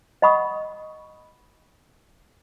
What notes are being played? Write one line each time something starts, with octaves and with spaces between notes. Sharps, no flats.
D#5 F#5 B5 C#6 D#6